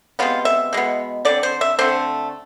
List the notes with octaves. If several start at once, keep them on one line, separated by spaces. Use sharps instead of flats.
C3 G#3 B3 F4
E5
B2 G#3 B3
D3 G#3 C4 D5
C5
E5
D3 A3 C4 C5